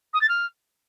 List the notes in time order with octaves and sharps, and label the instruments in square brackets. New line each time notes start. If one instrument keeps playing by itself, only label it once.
[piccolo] D#6
A6
F6